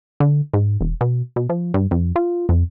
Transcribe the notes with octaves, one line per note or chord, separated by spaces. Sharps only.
D3
G#2
E1
B2
B2
F3
G2
F2
F4
F2